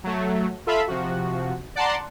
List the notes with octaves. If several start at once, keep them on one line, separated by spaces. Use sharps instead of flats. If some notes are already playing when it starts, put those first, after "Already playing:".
F#3 A3
F4 A4 E5 F5 B5
C3 F3 F#4
D5 F#5 A5 A#5 C6